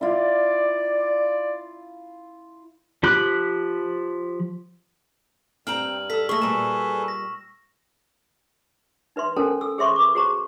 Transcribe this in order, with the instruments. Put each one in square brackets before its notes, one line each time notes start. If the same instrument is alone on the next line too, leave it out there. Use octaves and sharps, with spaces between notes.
[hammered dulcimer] E4 F4 [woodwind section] D5
[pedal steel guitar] F3 G4 B5 F#6
[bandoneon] G2 [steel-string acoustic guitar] C4 G5 A#5 [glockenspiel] F6 F#7
[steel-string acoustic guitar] A4 [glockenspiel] E6 B6
[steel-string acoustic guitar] A3 G#4 [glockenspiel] C#6 A#6
[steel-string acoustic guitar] A#2 G3 [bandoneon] G#4 A4 B4 [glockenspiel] E7
[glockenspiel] A#6
[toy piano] D#4 B4 E5 C6
C#4 A4 A#4 C5 G#5 A5
A4 E6
G#4 C5 E5 C6 C#6
B4 D6
F#4 G#4 C5 A5 A#5 C#6